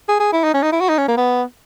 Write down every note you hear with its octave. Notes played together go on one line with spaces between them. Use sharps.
G#4
G#4
E4
D#4
C#4
D#4
E4
F#4
D#4
C#4
A#3
B3